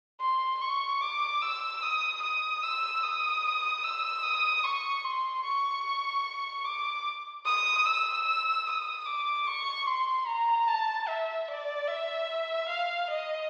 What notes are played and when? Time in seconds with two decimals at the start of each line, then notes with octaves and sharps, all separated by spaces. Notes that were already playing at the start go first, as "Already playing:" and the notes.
0.20 C6
0.61 C#6
1.01 D6
1.42 E6
1.82 D#6
2.22 D#6
2.62 E6
3.03 D#6
3.83 E6
4.23 D#6
4.63 C#6
5.04 C6
5.44 C#6
6.65 D6
7.45 D#6
7.85 E6
8.67 D#6
9.06 D6
9.47 C#6
9.86 C6
10.27 A#5
10.68 A5
11.08 E5
11.48 D5
11.88 E5
12.68 F5
13.09 D#5